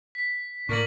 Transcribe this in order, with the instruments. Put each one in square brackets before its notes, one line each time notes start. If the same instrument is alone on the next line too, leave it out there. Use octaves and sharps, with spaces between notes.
[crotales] B6
[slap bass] A2 [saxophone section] A#3 D4 [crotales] C#6 A6 F#7